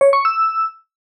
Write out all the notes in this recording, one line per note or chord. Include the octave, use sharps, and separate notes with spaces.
C#5
C#6
E6